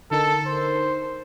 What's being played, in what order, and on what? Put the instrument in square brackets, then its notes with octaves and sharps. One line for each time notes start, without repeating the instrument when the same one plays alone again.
[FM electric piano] D3 D#4 A#4 [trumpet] A4
[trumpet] C5